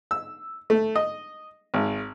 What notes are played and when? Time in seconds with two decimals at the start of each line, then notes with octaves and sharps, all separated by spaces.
0.11 E6
0.70 A3
0.96 D#5
1.74 G#1